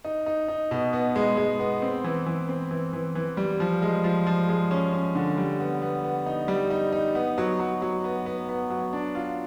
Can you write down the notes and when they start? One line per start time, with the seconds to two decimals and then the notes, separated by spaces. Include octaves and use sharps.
0.04 D#4
0.26 D#4
0.48 D#4
0.71 B2
0.93 B3
1.16 G#3
1.37 G#3
1.59 B3
1.82 C4
2.04 E3
2.26 E3
2.49 C4
2.71 E3
2.93 E3
3.15 E3
3.37 G3
3.60 F3
3.82 G#3
4.04 F3
4.27 F3
4.49 G#3
4.71 C#4
4.93 C#4
5.15 D3
5.38 G3
5.60 B3
5.82 B3
6.04 B3
6.26 D#4
6.48 G3
6.71 D#4
6.92 D#4
7.15 B3
7.38 F#3
7.60 F#3
7.82 F#3
8.04 B3
8.26 B3
8.49 B3
8.70 F#3
8.93 D4
9.15 F4